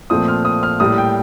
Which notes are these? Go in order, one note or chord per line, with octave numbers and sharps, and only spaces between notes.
A#2 F3 A3 C4 D#6
F6
D#6
F6
A2 G3 A#3 D#6
G5